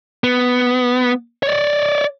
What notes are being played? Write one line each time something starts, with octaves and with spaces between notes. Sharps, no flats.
B3
C#5 D5